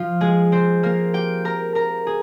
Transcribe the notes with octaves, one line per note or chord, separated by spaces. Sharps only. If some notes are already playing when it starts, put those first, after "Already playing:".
Already playing: F3 F4
G#3 G#4
C4 C5
A#3 A#4
G4 G5
A#4 A#5
A#4 A#5
G#4